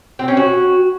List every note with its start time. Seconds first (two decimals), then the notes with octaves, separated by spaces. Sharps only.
0.19 C4
0.28 C#4
0.37 F#4